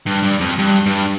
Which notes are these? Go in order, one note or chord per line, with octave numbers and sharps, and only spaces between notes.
G2
G2
F2
G2
G2